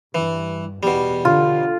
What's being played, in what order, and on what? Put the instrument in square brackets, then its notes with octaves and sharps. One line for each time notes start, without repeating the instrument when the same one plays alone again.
[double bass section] G2 [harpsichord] E3
[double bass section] E2 B3 [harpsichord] B2 G3
[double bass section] D3 [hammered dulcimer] F4